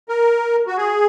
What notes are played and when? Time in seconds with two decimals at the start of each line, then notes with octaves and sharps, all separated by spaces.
0.09 A#4
0.67 F#4
0.77 G#4